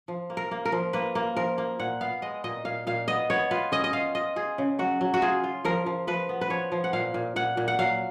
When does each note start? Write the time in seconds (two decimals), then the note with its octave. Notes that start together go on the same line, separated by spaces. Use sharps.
0.08 F3
0.30 A#3
0.37 A#4
0.51 A#3
0.65 A#4
0.72 F3
0.93 A#3 B4
1.15 A#3
1.36 F3 A#4
1.58 A#3
1.79 A#2 F#5
2.01 B3 F5
2.22 G#3 D#5
2.44 A#2 D#5
2.65 A#2 F5
2.87 A#2 F5
3.08 B3 D#5
3.30 B3 C#5
3.51 F4 B4
3.72 C#4 D#5
3.84 D#5
3.93 F4 F5
4.15 F4 D#5
4.36 F4 G#4
4.58 C#3
4.79 F#3 F#4
5.01 F#3
5.14 F#4
5.22 F4 G#4
5.44 F4
5.65 F3 A#4
5.86 F3
6.07 F3 B4
6.29 B3
6.41 B4
6.50 F3 C#5
6.72 F3
6.84 F#5
6.93 A#2 F5
7.14 A#2
7.36 A#2 F#5
7.57 A#2
7.68 F#5
7.79 F#3 F5